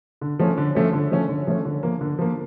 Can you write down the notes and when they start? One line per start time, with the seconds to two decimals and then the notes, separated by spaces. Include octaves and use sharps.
0.21 D3
0.39 F3 A3 C#4
0.58 D3
0.75 F3 A3 C#4
0.93 D3
1.11 F3 A3 C#4
1.29 D3
1.47 F3 A3 C#4
1.65 D3
1.83 F3 A#3
2.01 D3
2.19 F3 A#3